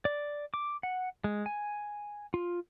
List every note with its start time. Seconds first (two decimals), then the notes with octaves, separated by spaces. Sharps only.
0.05 D5
0.54 D6
0.83 F#5
1.24 G#3
1.46 G#5
2.34 F4